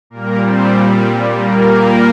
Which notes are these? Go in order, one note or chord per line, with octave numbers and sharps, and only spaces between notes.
A#2 G3 A#3 A#4
C4 C5
A#3 A#4